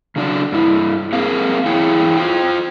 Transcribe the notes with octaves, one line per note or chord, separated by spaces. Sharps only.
C#3 F#3 D4 C#5 D5
G2 E4
A#3 C4 G#4 A#4 F5
E2 E4 G#4 C#5 G5
F4 C5 G5